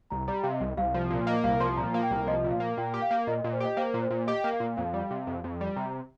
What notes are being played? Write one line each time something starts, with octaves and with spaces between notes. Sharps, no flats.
C2 A#5
G3 A#5
C3 F5
D#5
C2
C2 F5
F3
A#2
A#3 D#5
C2 F5
F3 C6
A#2 A#5
A#3
G5
C2
F3 D#5
A#2
F5
A#3
A#2 G5
G4
F5
A#3
A#2 D#5
D#5
A#2
C5
G4 D#5
A#3 C5
A#2
C5
A#2
G4 D#5
A#3
F5
A#2
F2 F5
G3
C3
F2
F2
G3
C3 A#5